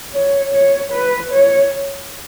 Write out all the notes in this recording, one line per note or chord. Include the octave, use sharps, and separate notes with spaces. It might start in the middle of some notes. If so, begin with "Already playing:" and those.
C#5
C#5
B4
C#5